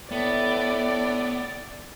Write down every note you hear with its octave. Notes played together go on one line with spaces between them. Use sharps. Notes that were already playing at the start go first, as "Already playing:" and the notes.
A2 B3 D5